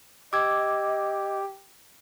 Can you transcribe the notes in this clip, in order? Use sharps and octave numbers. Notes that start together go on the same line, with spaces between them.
G4 D#5 D6 E6 G#6